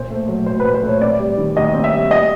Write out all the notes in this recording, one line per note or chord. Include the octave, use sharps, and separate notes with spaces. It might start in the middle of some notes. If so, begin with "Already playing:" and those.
Already playing: A#2 C5
A3
F#3
A#2 C5
B4
A#2
C5
A3 C#5
C4 D5
G3
D#3
D#2 D#5
C4
E5
G3
D#5